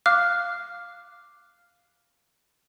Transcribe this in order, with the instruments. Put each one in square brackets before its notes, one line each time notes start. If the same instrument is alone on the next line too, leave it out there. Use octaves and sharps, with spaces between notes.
[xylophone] F5 D6 F6 F#6